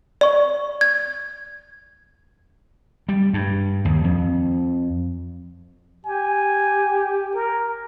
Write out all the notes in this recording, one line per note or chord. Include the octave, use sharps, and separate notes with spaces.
D5 C#6
G#6
G3
G2
D#2
F2
G4 G#5
A#4